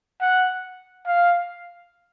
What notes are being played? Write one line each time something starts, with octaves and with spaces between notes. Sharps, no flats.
F#5
F5